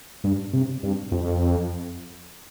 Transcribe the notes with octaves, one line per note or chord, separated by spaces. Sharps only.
G2
C3
G2
F2